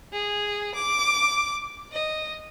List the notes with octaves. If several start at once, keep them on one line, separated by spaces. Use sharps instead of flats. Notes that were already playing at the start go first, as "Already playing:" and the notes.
G#4
D6
D#5